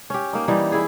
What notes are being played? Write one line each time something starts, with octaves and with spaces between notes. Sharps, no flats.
C#4 G4
A#3 D#4
E3 G3 D#4
E4 G#4